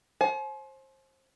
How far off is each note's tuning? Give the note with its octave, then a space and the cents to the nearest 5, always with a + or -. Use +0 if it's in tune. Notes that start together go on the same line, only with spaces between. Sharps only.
C5 +30 G#5 +45